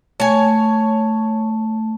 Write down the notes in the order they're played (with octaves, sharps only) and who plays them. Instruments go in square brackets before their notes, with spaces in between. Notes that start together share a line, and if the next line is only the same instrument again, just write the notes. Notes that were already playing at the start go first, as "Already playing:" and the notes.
[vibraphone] A3 [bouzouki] C#5 G#5